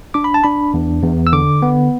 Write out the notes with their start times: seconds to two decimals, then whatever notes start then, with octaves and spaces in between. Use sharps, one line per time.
0.14 D4 D6
0.24 B5
0.34 A5
0.44 D4 B5
0.74 E2
1.03 E2
1.27 E6
1.33 D3 D6
1.62 B3